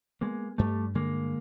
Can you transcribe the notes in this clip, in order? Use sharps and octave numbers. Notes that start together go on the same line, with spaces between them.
G#3 A#3 B3
G2 G3 A3
D3 G#3 A#3